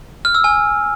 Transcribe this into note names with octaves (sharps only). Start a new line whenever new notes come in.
F6
E6
G#5